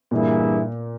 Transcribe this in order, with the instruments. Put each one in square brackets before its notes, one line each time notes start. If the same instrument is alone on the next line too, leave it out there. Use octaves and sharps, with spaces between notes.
[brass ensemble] G2 E3 A#3 E4 G#4 [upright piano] A#2